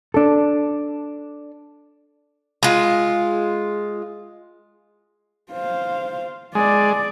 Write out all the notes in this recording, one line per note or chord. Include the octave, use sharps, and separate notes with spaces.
D4 A4
G#3 F4
C5 F5
G#3 D5